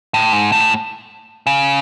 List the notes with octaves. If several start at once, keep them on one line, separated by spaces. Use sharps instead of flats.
A2
G#2
A2
C#3